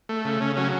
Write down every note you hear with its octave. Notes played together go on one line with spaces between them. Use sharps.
A3
C#3
C#3 C#4
F#3 C#4